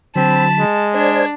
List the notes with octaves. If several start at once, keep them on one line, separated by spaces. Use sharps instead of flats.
D3 F#3 C4 A5 B5
G#3
D4 C5 D5 G#6